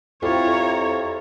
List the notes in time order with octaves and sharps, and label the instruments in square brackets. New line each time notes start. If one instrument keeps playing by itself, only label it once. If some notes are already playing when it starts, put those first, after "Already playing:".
[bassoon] F2 [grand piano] E4 F4 G4 [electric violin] C#5 A#5